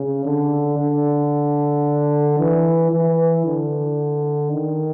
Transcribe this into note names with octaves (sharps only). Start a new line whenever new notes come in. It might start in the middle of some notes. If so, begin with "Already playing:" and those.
Already playing: C#3
D3
D3
E3
E3
D3
D#3